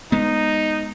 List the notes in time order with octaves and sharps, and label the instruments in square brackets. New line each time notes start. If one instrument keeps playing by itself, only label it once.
[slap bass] G#3 B3 [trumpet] D#4